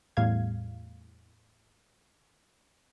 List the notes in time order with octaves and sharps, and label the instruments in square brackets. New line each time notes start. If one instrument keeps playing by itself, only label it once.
[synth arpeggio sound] E2 A2 G3 F5 G#6